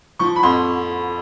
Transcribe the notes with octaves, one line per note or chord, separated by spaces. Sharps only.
F3 C#6
B5
F2 C6